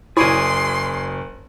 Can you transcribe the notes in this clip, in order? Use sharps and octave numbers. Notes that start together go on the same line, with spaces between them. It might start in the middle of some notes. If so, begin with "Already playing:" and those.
F#1 E4 G#4 C#5 D5 G#5 C6